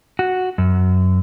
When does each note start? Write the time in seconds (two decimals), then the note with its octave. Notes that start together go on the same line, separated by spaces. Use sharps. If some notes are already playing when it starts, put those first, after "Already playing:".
0.19 F#4
0.58 F#2